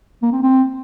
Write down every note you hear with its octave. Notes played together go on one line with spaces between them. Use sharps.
A#3
C4
C4